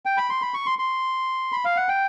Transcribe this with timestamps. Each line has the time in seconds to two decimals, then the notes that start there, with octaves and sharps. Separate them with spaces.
0.06 G5
0.17 B5
0.30 C6
0.42 B5
0.54 C#6
0.66 C6
0.79 C6
1.52 B5
1.65 F5
1.76 F#5
1.89 G5